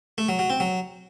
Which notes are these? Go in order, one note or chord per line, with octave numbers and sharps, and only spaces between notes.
A3
F#3
F#3
C4
F#3